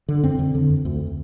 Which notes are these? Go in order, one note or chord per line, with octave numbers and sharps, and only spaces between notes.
D3
F2 C4
D3
D3
F2
D2